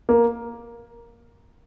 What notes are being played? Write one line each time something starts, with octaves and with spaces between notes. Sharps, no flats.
A#3